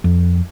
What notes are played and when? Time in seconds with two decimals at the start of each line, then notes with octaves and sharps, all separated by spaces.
0.04 F2